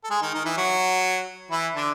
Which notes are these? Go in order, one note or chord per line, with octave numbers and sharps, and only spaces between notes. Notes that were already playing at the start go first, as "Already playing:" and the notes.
A4
G#3 G#4
D#3 D#4
D#3 D#4
E3 E4
F#3 F#4
E3 E4
D3 D4